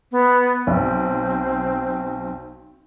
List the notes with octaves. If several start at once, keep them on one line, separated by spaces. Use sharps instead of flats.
B3
B1 C4